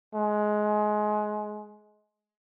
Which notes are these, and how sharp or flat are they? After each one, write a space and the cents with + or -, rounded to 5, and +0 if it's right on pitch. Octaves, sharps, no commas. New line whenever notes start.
G#3 +20